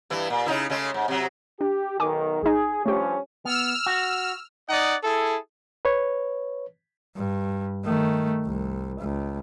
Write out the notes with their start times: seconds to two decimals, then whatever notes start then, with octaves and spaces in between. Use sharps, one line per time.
0.10 G2 E3 E4
0.30 A#2
0.46 C#3 D#4 E4
0.70 C#3 G#3 A3
0.94 G#2
1.08 C3 F#3
1.61 D4 G4
2.00 B1 D#3 G#5 D6
2.43 A1 D#4 G#4
2.86 G2 F3 A3 C#4 G4
3.45 B3 E6 F6
3.86 F#4
4.69 D#4 D5 D#5 F#5
5.04 E4 G#4 A4
5.85 B4 C#5
7.16 G2
7.85 D#3 A3
8.45 C2
9.00 C#2